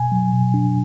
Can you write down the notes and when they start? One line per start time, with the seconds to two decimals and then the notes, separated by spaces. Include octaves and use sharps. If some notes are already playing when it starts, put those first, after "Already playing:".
Already playing: B2 G#5
0.12 F#3
0.32 B2
0.54 D4